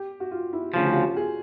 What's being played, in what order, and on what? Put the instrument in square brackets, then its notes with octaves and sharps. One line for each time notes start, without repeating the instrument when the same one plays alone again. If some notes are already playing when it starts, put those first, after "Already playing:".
Already playing: [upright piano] G4
F#4
F4
E4
[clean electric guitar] D2 C#3 F3 [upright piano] F4
[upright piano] F#4
F4
F#4
F#4
G#4